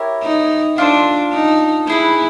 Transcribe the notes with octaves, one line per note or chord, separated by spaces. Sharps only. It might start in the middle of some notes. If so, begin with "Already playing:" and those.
Already playing: E4 G4 A#4 C#5
D#4
D4 F4 A4 C5
D#4
D#4 E4 G#4 B4